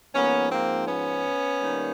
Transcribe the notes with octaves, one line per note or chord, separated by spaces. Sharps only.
G#2 F3 A#3 B3 C#4
A#3 C4
B3 C#4
D#3 G3 A#3